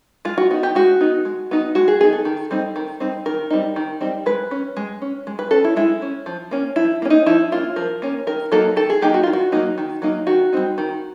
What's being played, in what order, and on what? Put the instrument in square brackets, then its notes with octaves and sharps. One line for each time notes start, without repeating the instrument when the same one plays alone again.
[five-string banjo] G#3 F4
F#4
B3 D#4 F#4
G4
G#3 F#4
B3 D#4
G#3
B3 D#4
G#3 F#4
G#4
B3 D#4 G#4
A4
D#3
G3 C4 D#4
D#3
G3 C4 D#4
D#3 A#4
G3 C4 D#4
D#3
G3 C4 D#4
G#3 B4
C#4
G#3
C#4
G#3
B4
C#4 A4
E4
G#3 E4
C#4
F3
A#3 C#4
F3 E4
A#3 C#4
D#4
F3 E4
A#3 C#4 F4
F3 A#4
A#3 C#4
D#3 A#4
F#3 A#3 D#4 A4
D#3 A4
G#4
F#3 A#3 D#4 G4
F#4
D#3 F4
F#4
F#3 A#3 D#4
D#3
F#3 A#3 D#4
D#3 F#4
G3 C4 D#4
D#3